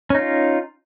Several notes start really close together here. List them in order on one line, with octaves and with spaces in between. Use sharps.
C#4 D#4 F4